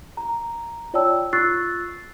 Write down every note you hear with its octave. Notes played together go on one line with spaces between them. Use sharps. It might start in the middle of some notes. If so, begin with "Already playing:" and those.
A#5
F4 C#5 D5 G5 A5 E6
F4 C#6 E6 F#6 A6 C7